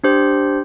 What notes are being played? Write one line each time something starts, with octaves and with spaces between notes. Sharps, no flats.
D4 G4 C5